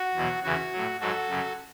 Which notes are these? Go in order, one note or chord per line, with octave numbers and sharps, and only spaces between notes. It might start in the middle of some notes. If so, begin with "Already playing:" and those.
Already playing: F#4
E2 B2 F#3
E2 C#3 E3 F#4
A2 F#3
G#2 F#3 F#4 A4
F#2 C#3 F#3